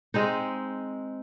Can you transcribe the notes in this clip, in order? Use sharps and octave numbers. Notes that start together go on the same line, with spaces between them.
G#3 C4 D#4